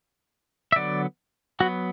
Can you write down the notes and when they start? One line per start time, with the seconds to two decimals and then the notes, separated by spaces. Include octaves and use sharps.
0.72 E5
0.76 D3 F#3 B3 D5
1.60 F#3 B3 F#4